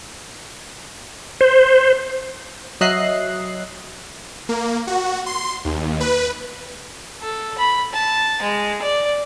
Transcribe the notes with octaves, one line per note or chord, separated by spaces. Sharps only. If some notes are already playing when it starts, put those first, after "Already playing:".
C5
F#3 D#5 E5 F#6 C7
A#3
F#4
C6
D#2
B4
A4
B5
A5
G#3
D5